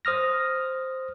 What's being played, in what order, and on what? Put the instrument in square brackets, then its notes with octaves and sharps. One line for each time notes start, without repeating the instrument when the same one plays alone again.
[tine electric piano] C5 D#6 F6 A#6